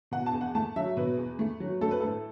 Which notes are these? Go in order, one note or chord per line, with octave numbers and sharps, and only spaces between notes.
B2 F#5
A5
E2
F#5
A3 A5
F#3 E5
B2 B4
E2
A3
F#3
A3 A4
B4
A2 A4